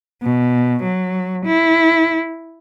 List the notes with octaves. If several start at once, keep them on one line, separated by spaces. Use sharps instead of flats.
B2
F#3
E4